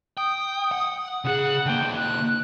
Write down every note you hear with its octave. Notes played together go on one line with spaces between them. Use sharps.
G5 D#6
F#5
C#3 G#4 F#5
D3 A#3 G5
F#6